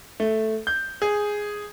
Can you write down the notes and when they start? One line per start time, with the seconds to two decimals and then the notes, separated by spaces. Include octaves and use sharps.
0.20 A3
0.67 G6
1.02 G#4